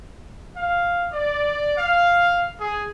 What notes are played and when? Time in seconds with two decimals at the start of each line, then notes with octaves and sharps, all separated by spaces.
0.55 F5
1.12 D5
1.78 F5
2.58 G#4